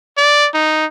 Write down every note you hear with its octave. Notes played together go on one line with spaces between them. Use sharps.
D5
D#4